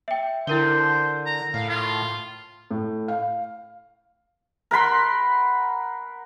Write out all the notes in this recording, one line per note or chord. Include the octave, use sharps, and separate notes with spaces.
E5 G5
D3 E4 A#4 C5 G7
A#5
A2 F5
F4
A2
F5
A#4 F#5 B5 C6